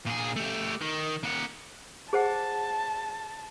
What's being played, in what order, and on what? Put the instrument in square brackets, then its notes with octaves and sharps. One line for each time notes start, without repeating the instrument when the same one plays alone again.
[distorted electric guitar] A#2 G#4
A3 G4
D#3
A#3 F#5
[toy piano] G#4 C5 F#5 [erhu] A5